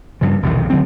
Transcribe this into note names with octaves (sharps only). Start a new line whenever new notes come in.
G2 C#3 F3
B1 E2 C3 D#3
D3 F#3 C4